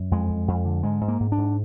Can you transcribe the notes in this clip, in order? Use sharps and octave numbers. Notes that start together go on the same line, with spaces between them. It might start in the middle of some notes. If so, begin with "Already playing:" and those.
Already playing: F#2
F2 G#3
F2
F2
D3
G#2 G#3
G#2
A#3
G#2
D4
G#2